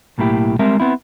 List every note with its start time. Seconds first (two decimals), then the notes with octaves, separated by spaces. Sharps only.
0.18 B1 A2 A#3 E4 G4
0.59 G3 G#3 C4 A#4 E5
0.80 B3 C4 E4